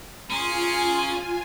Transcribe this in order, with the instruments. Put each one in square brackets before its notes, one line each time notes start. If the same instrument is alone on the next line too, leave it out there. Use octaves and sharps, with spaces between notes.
[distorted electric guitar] C#4 [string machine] F4 G#5 [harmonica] G#4 A#4 C6